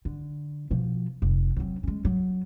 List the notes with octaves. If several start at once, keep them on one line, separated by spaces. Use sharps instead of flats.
D3
B2 F3
F1
F#3 C4
G#3 C#4
F#3